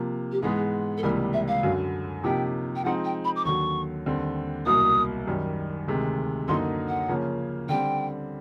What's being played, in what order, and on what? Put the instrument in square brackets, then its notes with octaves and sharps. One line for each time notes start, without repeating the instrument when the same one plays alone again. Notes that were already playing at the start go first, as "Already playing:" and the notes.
Already playing: [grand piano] C3 F3 A#3
[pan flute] G4
[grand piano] G#2 E3 G#3 B3 [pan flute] G#4
[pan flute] A4
[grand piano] C#2 C3 E3 G3 A#3 [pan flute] A#4
[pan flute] E5
F5
[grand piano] F#2 D3 F#3
[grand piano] C3 F3 A#3 D#4 G4 [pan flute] G5
[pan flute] G5
[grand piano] F3 G#3 C4 D#4 [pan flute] F#5
[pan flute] G5
B5
D6
[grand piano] D#2 D3 F#3 [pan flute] C#6
[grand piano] D#2 D3 G3 C4
[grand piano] C2 B2 F#3 A#3 [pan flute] D#6
[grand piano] F#2 D#3 G3
D2 C3 D#3 G#3
[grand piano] F#2 D3 F#3 A#3 D#4 [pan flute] C6
[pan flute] F#5
[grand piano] C#3 F3 A#3 C#4
[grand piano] D3 G3 C4 [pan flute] G5